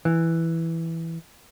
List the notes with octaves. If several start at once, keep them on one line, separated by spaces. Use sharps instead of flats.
E3